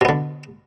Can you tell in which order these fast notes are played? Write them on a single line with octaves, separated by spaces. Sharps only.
B2 B3 D3